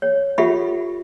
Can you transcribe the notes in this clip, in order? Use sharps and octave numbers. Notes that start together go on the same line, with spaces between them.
C#5
F4 G4 A4 E5 F#5 B5